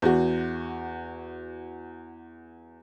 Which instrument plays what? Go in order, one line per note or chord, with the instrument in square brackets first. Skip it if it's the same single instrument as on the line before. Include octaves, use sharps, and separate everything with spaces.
[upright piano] E2 F#4